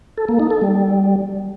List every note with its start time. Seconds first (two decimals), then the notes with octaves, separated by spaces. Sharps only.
0.18 A4
0.29 A#3
0.40 D#4
0.51 A4
0.62 G3